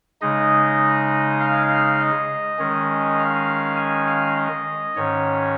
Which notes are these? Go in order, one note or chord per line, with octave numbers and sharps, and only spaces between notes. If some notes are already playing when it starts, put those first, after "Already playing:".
C#3 G#3 D#4 D#5
F5
D#5
D#3 G#3 C#4
F5
G#5
F5
D#5
G#2 D#3 C#4 C#5